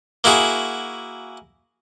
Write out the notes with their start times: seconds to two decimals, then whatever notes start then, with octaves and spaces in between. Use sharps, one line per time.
0.24 A#3 E4 F#4 G#4